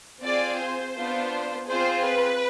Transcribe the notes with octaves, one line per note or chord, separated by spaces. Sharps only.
C4 F4 G#4 D5
C5
B3 D4 F4
C4 F4 G#4 C5
B4